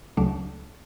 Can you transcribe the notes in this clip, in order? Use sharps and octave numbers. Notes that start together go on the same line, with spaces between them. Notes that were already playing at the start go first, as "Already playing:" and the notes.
C#2 C#3 F#3 A3 D4